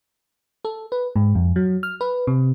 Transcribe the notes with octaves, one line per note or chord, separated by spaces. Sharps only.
A4
B4
G#2
F2
F#3
F6
B4
C3